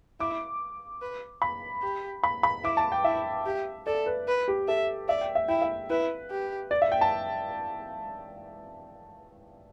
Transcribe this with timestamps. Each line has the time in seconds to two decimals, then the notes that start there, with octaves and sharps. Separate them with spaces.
0.20 E4 D6
1.01 B4
1.42 B5
1.82 G4
2.24 B5
2.43 B5
2.64 E4 D6
2.77 A5
2.92 G5
3.04 E4 E5
3.46 G4
3.86 A4 D5
4.06 B4
4.28 B4
4.48 G4
4.68 A4 E5
5.08 D5 E5
5.21 G5
5.35 E5
5.48 E4 G5
5.62 E5
5.90 E4 B4
6.31 G4
6.71 D5
6.82 E5
6.92 G5
7.01 A5